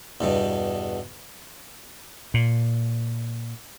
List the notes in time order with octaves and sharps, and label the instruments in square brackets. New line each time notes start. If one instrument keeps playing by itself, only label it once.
[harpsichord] E2 G2 B2
[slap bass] A#2